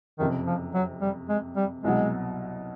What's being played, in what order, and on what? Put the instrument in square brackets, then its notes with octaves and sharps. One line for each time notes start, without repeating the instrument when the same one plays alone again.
[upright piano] F#1 F2 C3 [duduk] D#3
[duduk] F3
F#3
G3
G#3
G3
[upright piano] C2 B2 F#3 [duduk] G#3